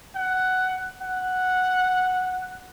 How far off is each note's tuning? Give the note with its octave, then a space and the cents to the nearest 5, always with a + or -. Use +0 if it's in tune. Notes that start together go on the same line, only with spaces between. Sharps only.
F#5 +10
F#5 -5